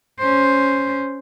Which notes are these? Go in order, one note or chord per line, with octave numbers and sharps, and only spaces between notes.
C#4 C5